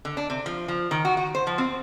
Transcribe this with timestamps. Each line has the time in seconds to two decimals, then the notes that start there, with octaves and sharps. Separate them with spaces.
0.05 D3
0.17 D4
0.30 C3
0.46 F3
0.68 F3
0.91 D#3
1.05 F#4
1.17 F#4
1.35 C5
1.47 F3
1.58 C4